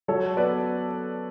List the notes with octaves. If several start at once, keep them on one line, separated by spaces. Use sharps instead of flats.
F#3 A4 C#5
B3 B4 D5